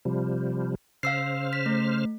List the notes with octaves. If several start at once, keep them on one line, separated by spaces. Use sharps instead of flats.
C3 F3 G3
C#3 C5 F5 E6 F6 C7
B6
A3